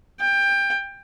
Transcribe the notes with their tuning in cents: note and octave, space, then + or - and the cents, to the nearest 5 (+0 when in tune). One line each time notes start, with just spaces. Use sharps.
G5 +20